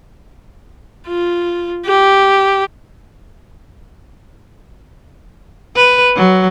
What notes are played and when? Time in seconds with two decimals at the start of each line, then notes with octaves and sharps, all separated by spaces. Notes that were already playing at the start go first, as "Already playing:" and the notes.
1.07 F4
1.86 G4
5.76 B4
6.16 F#3